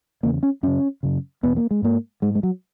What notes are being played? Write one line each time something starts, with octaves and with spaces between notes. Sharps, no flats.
E2 C#3 A#3
C#4
F#2 C#3 C#4
F#2 C#3
E2 B2 B3
A#3
G#3
G#2 A#3
G#2 G#3
G#3
F#3